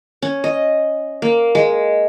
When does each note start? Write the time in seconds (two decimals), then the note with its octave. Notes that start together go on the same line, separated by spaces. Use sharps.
0.22 C#4
0.44 D#5
1.22 A#3
1.55 G#3